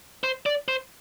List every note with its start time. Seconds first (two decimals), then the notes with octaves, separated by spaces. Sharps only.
0.23 C5
0.46 D5
0.68 C5